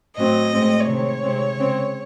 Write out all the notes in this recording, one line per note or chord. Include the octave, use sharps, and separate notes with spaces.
A2 F#3 C4 D#5
A2 G#3 C4
C3 D#3 G#3 C4 C#5
C3 D#3 G#3 C4
C#3 G#3 C4